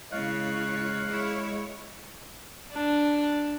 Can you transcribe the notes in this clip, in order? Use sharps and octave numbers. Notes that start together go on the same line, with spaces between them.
C#3 G#3 E4 C#5 F5 F#6
E4 G#4 C#5
D4